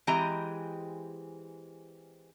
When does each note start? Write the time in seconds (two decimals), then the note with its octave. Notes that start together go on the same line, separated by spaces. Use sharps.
0.07 E3 G#3 C4 G4 D#5 A#5